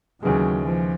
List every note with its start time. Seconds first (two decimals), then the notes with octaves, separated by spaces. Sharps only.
0.22 D#2 C#3 E3 F#3 G#3
0.64 F3